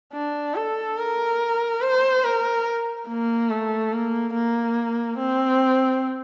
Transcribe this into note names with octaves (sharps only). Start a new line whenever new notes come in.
D4
A4
A#4
C5
A#4
A#3
A3
A#3
A#3
C4